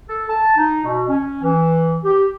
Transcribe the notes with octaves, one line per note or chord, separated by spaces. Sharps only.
A4
A5
D#4
B2
C#4
E3
G4